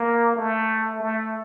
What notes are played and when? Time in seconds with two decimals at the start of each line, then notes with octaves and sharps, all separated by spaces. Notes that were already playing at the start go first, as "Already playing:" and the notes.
Already playing: A#3
0.36 A3
1.01 A3